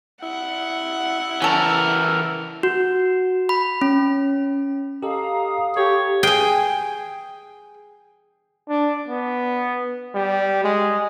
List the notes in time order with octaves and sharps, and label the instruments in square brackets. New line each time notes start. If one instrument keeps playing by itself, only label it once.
[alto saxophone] E4 [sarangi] F#5
[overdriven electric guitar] E3 A#4 [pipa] C#4 A4
[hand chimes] F#4
B5
C#4
[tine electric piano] G4 A4 D#5 [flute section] F5 A#5 D#6
[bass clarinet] G4 [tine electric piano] A4 [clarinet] C#5
[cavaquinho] G#4 G#5 [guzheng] G5
[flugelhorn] D4
B3
G3
G#3